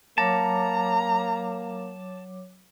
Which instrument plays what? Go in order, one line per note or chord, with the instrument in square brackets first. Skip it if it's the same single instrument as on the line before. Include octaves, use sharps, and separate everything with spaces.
[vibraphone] F#3 C#5 D6 [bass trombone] A#3 [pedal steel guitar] A5 [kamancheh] A#5